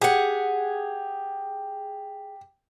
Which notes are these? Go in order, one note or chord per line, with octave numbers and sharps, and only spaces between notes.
G4 G#4 F#5